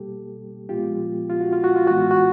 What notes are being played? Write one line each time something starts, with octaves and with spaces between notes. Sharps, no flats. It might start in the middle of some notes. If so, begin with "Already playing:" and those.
Already playing: B2 G3 A#3 G4 A4
A#2 F3 G#3 B3 F4 G4
F4
F#4
F4
F#4
F4
A2 E3 G#3 B3 F#4
F4
F#4